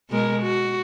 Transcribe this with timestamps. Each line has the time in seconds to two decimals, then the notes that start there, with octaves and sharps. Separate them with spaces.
0.10 B2 G#3 A#4
0.43 F#4